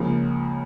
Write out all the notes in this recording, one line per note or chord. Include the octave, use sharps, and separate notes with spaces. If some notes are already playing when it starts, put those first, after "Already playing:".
Already playing: C#2 C#3 F3 A#3